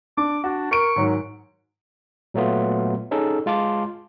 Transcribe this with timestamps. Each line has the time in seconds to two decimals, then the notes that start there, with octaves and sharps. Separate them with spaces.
0.17 D4 D6
0.44 D4 F#4
0.71 A#4 C#6 D7
0.96 G#2 D#3 F#3
2.34 A#2 F#3 A3 B3 F4
3.11 C#4 D#4 G#4 A4
3.46 G#3 F4 A5 D6